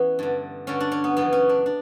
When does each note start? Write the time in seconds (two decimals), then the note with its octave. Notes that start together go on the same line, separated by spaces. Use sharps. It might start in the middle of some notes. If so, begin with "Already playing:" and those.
Already playing: E3 B3 C#4
0.19 G2 D3
0.67 G2 D3 C#4
0.81 D4
0.92 C#4
1.04 B3
1.17 F#2 C#3 E3 B3
1.33 C#4
1.49 D4
1.66 D4